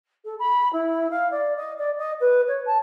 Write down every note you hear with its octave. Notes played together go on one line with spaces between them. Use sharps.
A4
B5
E4
F5
D5
D#5
D5
D#5
B4
C#5
A5